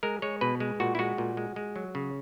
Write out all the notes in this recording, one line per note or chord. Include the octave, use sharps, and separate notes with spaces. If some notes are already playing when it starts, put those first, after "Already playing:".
G#3 A#4
G#3 C#5
B2 B4
G#3
A#2 F#4
E4
G#3 F#4
A#2
G#3
G#3
F#3
C#3